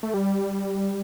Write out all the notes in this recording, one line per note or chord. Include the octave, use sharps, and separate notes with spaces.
A3
G3